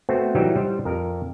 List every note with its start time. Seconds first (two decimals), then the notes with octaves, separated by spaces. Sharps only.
0.09 A3 B3 C4 F#4 C5
0.35 E3 F#3 G3 D#4 G4
0.55 G3 C5
0.85 F2 A#4